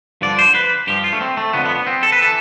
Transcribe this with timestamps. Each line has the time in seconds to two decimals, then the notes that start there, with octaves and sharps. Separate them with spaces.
0.21 G2 D3 F3 D5
0.39 C5
0.55 B4
0.87 G2 F3 G4
1.04 F4
1.13 A3
1.21 C4
1.37 A3
1.53 F2 D3 F3 B3
1.65 B3
1.76 B3
1.87 C4
2.03 A4
2.12 B4
2.22 E3 A4